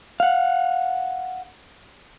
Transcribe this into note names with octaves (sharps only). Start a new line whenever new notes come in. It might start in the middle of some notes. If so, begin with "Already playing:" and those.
F5 F#5